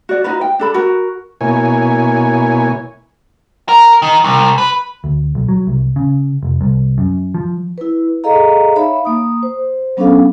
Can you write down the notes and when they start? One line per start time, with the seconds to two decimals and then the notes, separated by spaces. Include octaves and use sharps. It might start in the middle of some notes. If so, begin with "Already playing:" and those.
0.09 F#4 D5
0.24 D#4 F4 F#4 B4
0.41 G5
0.59 D4 A4 B5
0.74 F#4 A#4
1.41 B2 A#3 E4 C#5 G#5
3.69 A#4
4.02 D#3
4.24 C2
4.58 B4
5.04 D2
5.35 B1
5.49 F#3
5.67 C2
5.96 C#3
6.43 F1
6.61 C2
6.98 F#2
7.35 F3
7.78 E4 B4
8.24 G#4 A4 D#5 F5 A#5
8.76 D#4 C#5 E5 F5 B5
9.05 A#3 D#6
9.43 C5
9.97 F#3 B3 C#4 D4 A4 F5